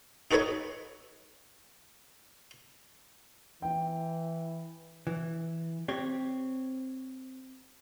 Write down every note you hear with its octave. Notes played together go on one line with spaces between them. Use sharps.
D#4 F#4 A4 B4 C#5 D#5
E3 G5
E3
C4 G4 C#5